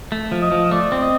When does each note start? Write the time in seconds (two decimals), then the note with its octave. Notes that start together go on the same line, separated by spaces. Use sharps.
0.12 A3
0.32 F3
0.42 D#5
0.52 F3
0.71 A3 D5
0.92 C4
1.01 D#5